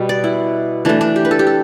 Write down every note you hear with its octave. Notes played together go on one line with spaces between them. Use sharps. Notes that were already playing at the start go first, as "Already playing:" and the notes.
Already playing: B2 G3 B3 B4
D5
E4
E3 A3 D4
D4
G4
B4
A4
G4
A4